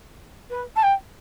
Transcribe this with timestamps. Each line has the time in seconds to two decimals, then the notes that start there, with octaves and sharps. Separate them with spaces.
0.50 B4
0.75 A5
0.82 G5